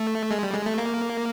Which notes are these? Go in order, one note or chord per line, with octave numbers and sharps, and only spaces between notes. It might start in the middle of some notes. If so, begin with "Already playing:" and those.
Already playing: A3
G#3
G3
G#3
A3
A#3